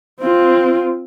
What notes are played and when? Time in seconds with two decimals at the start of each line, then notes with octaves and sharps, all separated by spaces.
0.21 C4 F4